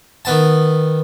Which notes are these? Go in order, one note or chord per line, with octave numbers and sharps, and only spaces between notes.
D#3 B3 A5